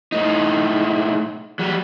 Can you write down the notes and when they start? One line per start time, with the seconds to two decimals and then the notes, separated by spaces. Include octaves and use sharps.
0.12 A2 D#4
1.59 F#3 G3